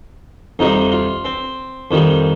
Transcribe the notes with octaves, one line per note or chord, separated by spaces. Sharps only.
F2 C3 G3 D#4
F4
C4
F2 D#3 G3